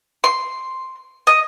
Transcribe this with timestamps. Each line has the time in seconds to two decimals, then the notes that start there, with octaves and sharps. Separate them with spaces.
0.24 C6
1.27 D#5